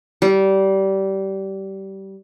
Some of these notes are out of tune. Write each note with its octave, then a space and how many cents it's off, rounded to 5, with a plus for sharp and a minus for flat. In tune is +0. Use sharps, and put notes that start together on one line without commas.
G3 -20